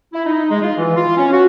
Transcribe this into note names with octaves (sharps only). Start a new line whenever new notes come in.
E4
D#4
G#3
F4
E3
F4
C#4
F#4